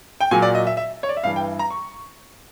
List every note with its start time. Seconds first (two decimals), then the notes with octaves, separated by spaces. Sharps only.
0.21 G5
0.31 A#2 F#3 G#5
0.42 D5
0.55 D#5
0.67 E5
0.77 E5
1.03 C#5
1.09 D5
1.17 E5
1.23 G2 E3 F5
1.36 G5
1.59 A#5
1.70 C#6